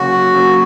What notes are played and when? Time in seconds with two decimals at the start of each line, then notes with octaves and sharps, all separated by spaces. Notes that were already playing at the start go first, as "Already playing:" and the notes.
Already playing: C#3 F#3 A#3 F#4
0.34 C#3 F#3 A#3